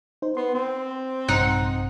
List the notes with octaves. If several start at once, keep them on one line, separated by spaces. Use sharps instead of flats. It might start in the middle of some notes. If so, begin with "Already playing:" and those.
D#4 C5
B3 C6
C4
A#1 G2 C3 D#4 F#5